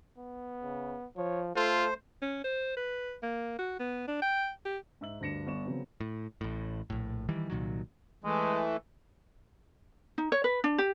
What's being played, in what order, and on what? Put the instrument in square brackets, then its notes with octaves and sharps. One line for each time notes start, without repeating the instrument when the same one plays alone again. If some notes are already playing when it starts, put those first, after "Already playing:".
[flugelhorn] B3
[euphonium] C#3
[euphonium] F3 [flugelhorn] C#5
[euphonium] A3 [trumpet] F4 [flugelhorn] A4 [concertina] C5
[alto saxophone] C#4
C5
B4
A#3
F#4
B3
D4
G5
G4
[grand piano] G#2 E5 E6 F#7
D2 G2 D4 A#6 C#7 E7
G1 B3 D5 C#6 E7
C#3 F#3 B3 C4
[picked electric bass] A2
A1 A2
A#1 A2
D#3 E3 G3
C2 A#2 D#3 F#3
[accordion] E3 A3 [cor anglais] G#3
[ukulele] D#4
C#5
B4
D4
G4